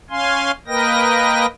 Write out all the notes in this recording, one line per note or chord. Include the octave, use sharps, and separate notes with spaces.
C#4 F5 G#5 C6
A#3 A#4 B4 D#5 G5 A#6